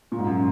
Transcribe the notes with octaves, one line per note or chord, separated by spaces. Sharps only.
A#2
G#2
F#2